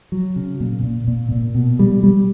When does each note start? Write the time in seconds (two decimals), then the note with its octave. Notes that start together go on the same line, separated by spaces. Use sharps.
0.12 F#3
0.36 C#3
0.60 A#2
0.83 A#2
1.08 A#2
1.32 A#2
1.55 B2
1.79 G3
2.03 G3